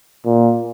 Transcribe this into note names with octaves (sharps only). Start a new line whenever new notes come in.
A#2